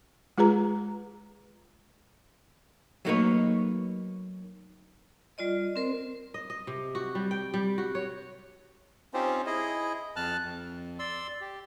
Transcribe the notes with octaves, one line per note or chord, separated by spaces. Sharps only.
G#3 F4 G#4 B4 A#5
F#3 A3 A#3 D#4 B4 C#5
G3 F4 D5 D#5
C4 A#4 C5
D#5
D#5
C3
F#4
G3
G5
G3
F#4
C#5
C4 C#4 D#4 F4 G4 C5
E4 G#4 D#5
F2 A5 F6 F#6
F2
D5 C6 E6
G4